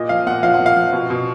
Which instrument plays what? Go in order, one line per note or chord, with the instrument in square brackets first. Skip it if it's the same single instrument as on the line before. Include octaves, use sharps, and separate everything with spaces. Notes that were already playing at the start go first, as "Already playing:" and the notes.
Already playing: [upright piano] A#2 D#5
F3 F5
A#2 F#5
F3 F5
F#5
A#2
F5
F3
B2
B2